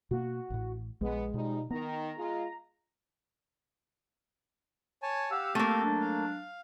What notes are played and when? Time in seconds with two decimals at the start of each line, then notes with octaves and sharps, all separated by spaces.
0.11 B2 A#3 F#4
0.50 A1 A2
1.01 A#1 G#3 B3
1.34 B2 F3 G3 D#4
1.70 D#3 B3 A#5
2.18 G#3 F4
5.03 C#5 G#5 A5
5.31 G4 F5 F#5 E6
5.55 A3 A#3 C4
5.84 F#3 G#3 D4
6.01 F5